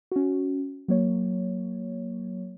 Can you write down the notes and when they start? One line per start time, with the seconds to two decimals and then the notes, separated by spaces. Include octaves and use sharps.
0.12 C#4 F#4
0.88 F#3 A#3 C#5